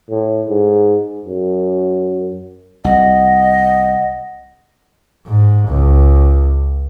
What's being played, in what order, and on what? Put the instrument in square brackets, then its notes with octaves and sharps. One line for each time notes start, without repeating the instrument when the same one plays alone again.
[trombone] A2
G#2
F#2
[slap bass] C2 [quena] D#5 [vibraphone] F#5
[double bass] G#2
C#2